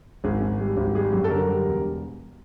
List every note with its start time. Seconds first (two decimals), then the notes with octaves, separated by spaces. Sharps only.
0.24 G#1 G#4
0.41 G#1
0.60 G3
0.77 G#1
0.95 G3 G#4
1.13 F#2
1.24 A4
1.30 D3 A#4
1.48 G3
1.65 E1